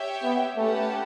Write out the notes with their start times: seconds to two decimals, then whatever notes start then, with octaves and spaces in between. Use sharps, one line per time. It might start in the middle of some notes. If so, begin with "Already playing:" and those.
Already playing: G4 C#5 E5 G5
0.23 B3
0.57 A3 C#4 G4 B4 F#5 A5